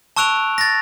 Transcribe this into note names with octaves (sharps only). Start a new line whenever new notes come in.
A5 C#6 E6 F#6 D7 F7
A6 A#6